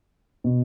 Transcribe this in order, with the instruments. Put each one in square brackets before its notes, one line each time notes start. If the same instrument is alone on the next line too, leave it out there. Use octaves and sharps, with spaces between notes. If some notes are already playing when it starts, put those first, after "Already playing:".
[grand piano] B2